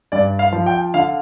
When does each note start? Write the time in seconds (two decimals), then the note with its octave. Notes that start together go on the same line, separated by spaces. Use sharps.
0.12 G2 D5
0.39 F5
0.53 F3
0.66 G5
0.94 D3 F5